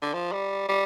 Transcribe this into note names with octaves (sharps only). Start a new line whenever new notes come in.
D3
F3
G3
G3